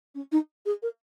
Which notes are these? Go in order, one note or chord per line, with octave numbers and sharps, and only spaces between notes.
C#4
D#4
G#4
A#4